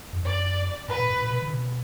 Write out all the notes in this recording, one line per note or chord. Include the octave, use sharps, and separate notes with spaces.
F#2
F#2 D5
G#2 B4
A#2
G#2
A#2
B2
D3
B2